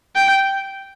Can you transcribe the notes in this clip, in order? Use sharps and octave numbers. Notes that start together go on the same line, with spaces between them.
G5